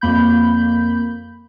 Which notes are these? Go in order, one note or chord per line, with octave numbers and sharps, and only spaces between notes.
F2 A#3 B5 G6